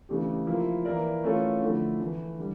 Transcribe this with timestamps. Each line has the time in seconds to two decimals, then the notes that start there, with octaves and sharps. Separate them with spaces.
0.09 C#3 E3 A3 D4 G4
0.47 F3 A#3 E4
0.85 E3 A#3 E4 A#4 D5
1.24 E3 A3 C#4 F4 A4
1.61 D3 F3 A3 E4
2.00 E3 A3 E4
2.38 D3 G3